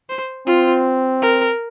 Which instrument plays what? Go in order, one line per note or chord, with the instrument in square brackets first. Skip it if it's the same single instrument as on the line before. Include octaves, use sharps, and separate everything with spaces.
[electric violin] C5
[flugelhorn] C4 [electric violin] F4
[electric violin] A#4